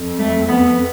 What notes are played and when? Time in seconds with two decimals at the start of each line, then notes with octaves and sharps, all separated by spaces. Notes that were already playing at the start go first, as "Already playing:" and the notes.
Already playing: F2
0.19 A3
0.48 B3